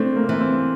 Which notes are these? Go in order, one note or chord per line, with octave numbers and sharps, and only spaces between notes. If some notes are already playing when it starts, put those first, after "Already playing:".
Already playing: A3 C4 D4 E4
A#3
C4
E3 A#3
C4